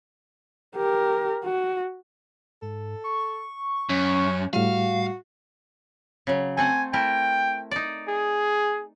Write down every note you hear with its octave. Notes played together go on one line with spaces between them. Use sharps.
G4 A#4
F#4
G#2 A4
C#6
F#2 C#4
A2 G3 F#4 F5
C#3 F#3
A3 C4 F#5 G#5
A3 E4 A#4 G5
D#4 D5
G#4